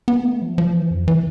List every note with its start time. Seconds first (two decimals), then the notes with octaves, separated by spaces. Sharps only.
0.08 B3
0.25 A3
0.42 F3
0.58 F3
0.75 E3
0.91 F2
1.08 E3